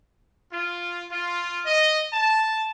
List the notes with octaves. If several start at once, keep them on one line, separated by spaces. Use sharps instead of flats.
F4
F4
D#5
A5